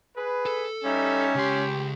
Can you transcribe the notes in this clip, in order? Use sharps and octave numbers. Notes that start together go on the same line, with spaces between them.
G#4 B4
A4
G3 C#4 D#4 E5
C#2 G4 C6